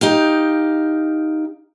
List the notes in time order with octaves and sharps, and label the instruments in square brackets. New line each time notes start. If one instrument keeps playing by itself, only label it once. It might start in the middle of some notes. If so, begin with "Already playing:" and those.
[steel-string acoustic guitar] D#4 G4 F5